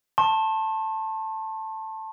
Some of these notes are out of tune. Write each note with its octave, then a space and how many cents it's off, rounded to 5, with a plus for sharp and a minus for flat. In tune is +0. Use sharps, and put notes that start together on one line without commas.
A5 +5 C6 +45